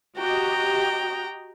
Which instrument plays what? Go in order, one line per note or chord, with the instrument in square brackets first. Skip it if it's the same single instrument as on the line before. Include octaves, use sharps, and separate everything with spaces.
[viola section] F#4 G4 D#5 [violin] G5 A#5